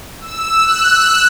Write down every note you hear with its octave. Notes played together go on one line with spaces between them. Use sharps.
E6
F#6